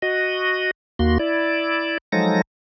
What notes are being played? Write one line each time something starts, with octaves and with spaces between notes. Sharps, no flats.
F#4 D#5
D#2 A#3 F#4 C6
E4 D5
F3 F#3 G#3 D#4 A4 A#6